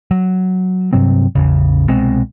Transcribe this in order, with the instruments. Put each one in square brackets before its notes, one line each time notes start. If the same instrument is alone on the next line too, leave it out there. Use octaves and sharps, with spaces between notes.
[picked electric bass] F#3
G2 C3 F#3 C4
A1 E2 C#3
C2 B2 G#3 C4